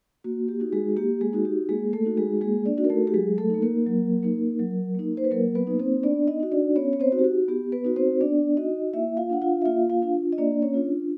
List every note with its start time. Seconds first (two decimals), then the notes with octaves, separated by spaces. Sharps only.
0.24 A#3 F#4
0.48 G4
0.60 D#4 F#4
0.73 G#3 G#4
0.96 A#3 G4
1.21 G#3 G#4
1.33 D#4 F#4
1.45 G4
1.69 G#3 A#3 G#4
1.93 A3 A4
2.05 D#4 F#4
2.17 G#3 G#4
2.41 G#3 A#3 G#4
2.65 D4 D5
2.77 D#4 F#4
2.84 A#4
2.90 A3 A4
3.07 G4
3.14 F#3 G#3 G#4
3.38 A3 A4
3.50 A#3 D#4
3.62 A#3 A#4
3.87 F#3
4.23 A#3 D#4
4.59 F#3
4.95 A#3 D#4
5.17 C5
5.24 B4
5.31 F#3 A#3 A#4
5.55 B3 B4
5.67 A#3 D#4
5.79 C4 C5
6.03 B3 D4 D5
6.27 D#4 D#5
6.40 D#4 F#4
6.52 D4 D5
6.76 B3 C#4 C#5
6.93 C#5
7.00 C4 C5
7.12 D#4 F#4
7.19 G4
7.24 F#4
7.48 B3 G4
7.72 B3 B4
7.85 D#4 F#4
7.96 C4 C5
8.21 B3 D4 D5
8.57 D#4 F#4 D#5
8.93 A#3 E4 E5
9.17 F4 F5
9.30 D4 F4 F#5
9.42 F4 F5
9.62 E5
9.65 A#3 F4 F5
9.90 F4 F5
10.02 D4 F4
10.33 D#5
10.38 A#3 D4 D5
10.62 C#4 C#5
10.74 D4 F4